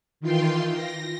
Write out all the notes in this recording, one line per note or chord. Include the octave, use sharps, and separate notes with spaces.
D#3 E3 F4 G5 C6
A#6